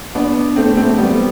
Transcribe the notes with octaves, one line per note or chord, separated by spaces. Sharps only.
B3 D4
A3 C4
A3 C4
G3 B3